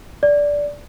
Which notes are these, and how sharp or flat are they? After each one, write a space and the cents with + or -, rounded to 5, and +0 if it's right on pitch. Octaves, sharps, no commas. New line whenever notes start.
D5 -10